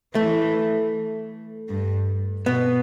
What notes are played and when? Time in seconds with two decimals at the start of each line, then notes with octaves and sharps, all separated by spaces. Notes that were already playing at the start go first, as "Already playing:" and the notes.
0.15 E3 A3
1.69 G2
2.46 B2 B3